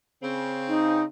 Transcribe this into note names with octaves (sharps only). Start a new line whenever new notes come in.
C#3 C4
D#4